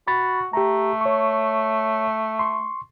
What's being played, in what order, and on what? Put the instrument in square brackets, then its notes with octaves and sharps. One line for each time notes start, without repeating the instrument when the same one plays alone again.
[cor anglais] F#4 [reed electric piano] B5 C#6 A6
[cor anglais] A3 [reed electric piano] G4 A#5
[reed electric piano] C#5 C#6
C6 C#6